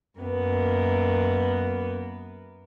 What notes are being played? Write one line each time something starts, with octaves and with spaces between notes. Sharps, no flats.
F#2 A#3 B3